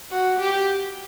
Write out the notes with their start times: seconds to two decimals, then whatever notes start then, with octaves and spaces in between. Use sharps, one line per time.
0.11 F#4
0.40 G4